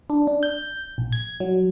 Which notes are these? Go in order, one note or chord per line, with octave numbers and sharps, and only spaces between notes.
D4
D4
G6
A#1
G#6
F#3